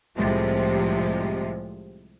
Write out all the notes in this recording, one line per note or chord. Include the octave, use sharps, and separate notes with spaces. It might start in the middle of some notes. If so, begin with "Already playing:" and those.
C2 A2 C3 F3 G3 G#3